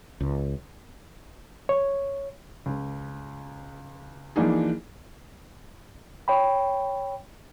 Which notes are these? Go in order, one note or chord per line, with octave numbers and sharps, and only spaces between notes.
C#2
C#5
C#2
E3 F3 A#3 D4 D#4 G#4
C#5 G5 B5